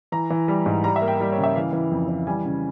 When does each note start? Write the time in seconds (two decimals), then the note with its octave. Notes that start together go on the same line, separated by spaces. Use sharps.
0.12 E3 A#5
0.30 E3
0.48 G3
0.66 G#2
0.84 G3 A#5
0.96 E5
1.02 A#3
1.08 G5
1.20 G3
1.32 C#5
1.38 C#3
1.43 E5
1.56 E3 F5
1.73 E3
1.91 F2
2.09 E3
2.27 G3 G#5
2.45 C#3